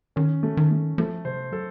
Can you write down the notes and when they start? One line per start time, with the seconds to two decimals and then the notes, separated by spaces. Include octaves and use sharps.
0.16 D#3 C#4
0.43 A3
0.57 D#3
0.71 A3
0.98 F3 A3
1.25 C3 C5
1.52 F#3 A4